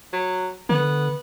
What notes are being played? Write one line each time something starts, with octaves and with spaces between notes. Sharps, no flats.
F#3
D3 B3